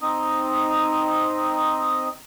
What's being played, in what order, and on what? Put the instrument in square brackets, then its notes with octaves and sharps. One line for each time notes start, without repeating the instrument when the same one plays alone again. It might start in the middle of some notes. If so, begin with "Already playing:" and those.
[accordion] C4 D#4 D#5